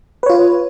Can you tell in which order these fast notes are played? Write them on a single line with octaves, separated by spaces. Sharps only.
B4 C#5 F4